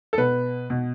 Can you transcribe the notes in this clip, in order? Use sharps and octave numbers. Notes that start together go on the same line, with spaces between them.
A4
B2 B4
B2